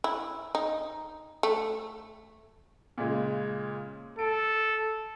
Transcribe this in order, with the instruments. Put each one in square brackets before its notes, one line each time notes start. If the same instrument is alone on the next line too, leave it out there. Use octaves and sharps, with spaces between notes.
[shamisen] E4
D#4
A3
[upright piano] A#2 C#3 G#3
[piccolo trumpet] A4 [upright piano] D7